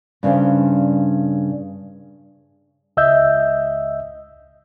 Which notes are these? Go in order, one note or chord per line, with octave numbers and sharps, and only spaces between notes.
G2 C#3 C#4 C5 D5
C#2 D#5 E5 E6 G6